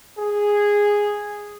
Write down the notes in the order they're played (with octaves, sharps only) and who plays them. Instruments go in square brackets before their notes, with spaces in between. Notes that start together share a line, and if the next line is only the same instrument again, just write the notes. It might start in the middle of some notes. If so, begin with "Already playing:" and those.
[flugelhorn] G#4